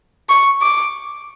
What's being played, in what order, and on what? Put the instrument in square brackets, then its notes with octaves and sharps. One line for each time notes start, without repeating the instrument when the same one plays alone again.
[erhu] C#6
D6